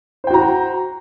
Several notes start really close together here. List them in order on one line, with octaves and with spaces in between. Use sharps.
C5 G5 F#4 A#5